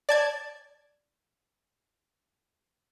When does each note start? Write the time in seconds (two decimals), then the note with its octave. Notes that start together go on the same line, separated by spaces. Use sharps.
0.09 D5 A5 G#6